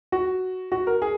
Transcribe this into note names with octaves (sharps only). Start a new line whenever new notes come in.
F#4
F#4
A#4
G#4